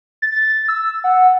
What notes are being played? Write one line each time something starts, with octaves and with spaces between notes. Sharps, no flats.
A6
E6
F#5